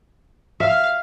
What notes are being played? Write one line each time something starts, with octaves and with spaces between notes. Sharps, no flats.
E5 F5